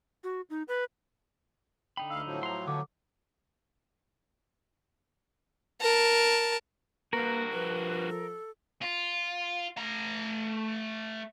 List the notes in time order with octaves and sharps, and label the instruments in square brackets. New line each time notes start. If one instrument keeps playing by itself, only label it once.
[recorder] F#4
D#4
B4
[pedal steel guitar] D3 D#4 B5 [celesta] G5
[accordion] D2 F5 [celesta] E6
[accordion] A2 F3 F#3
[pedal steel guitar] A#5 C6
[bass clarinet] D3 [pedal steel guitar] B3 C#5 [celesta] D6
[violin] A#4 A5
[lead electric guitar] G2 F#4 [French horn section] A#3 [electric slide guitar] A#4 [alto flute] B4
[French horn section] F3 [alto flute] B4
[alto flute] A4
[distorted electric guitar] F4
A3 A#5